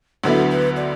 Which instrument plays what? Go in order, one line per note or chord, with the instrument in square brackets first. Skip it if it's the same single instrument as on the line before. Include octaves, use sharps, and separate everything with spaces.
[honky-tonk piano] D2 D3 F#3 B3 E4 [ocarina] A4
[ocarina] B4
D5